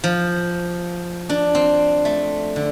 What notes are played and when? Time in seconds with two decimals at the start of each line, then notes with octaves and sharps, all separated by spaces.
0.04 F3
1.29 D4
1.55 C4
2.05 A3
2.56 D3